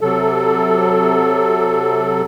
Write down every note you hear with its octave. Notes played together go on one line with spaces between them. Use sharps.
C3 F#3 A4